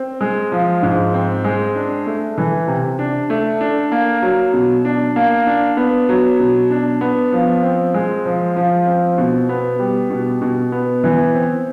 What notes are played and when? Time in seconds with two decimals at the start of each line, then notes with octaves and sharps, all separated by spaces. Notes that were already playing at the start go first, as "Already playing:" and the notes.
Already playing: C4
0.21 G#3
0.52 F3
0.83 G#2
1.14 C4
1.44 G#3
1.76 D4
2.06 A3
2.38 E3
2.68 C3
2.99 D4
3.30 A3
3.61 D4
3.92 A#3
4.23 F#3
4.53 B2
4.85 D4
5.16 A#3
5.47 D4
5.77 B3
6.09 F#3
6.39 B2
6.71 D4
7.01 B3
7.33 F3
7.63 C4
7.94 G#3
8.26 F3
8.56 F3
8.87 C4
9.18 B2
9.49 B3
9.79 G3
10.10 B2
10.42 B2
10.72 B3
11.04 E3
11.34 C4